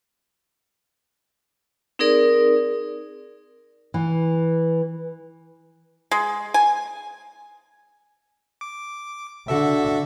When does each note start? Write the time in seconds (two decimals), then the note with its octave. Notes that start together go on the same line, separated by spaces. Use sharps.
1.99 C4 D#4 G#4 A#4 D5
3.94 E3
6.11 G#3
6.54 G#5
8.61 D6
9.48 D3 F#4 A4 E5